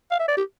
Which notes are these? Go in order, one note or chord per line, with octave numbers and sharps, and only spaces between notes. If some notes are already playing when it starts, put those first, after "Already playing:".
F5
E5
D5
G4